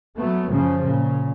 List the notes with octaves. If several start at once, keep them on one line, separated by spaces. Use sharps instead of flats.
F#3 A3 B3
F#2 C#3 F3
A#2 C#3